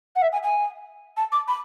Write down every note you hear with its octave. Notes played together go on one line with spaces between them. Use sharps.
F#5
E5
G#5
G#5
A5
D6
B5